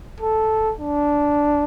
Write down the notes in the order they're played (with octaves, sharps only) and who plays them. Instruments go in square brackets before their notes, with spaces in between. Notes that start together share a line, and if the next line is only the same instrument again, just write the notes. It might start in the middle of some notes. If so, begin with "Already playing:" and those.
[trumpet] A4
D4